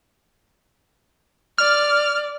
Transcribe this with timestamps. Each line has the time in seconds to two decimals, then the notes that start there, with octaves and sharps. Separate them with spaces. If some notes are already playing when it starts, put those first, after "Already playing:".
1.58 D5 F6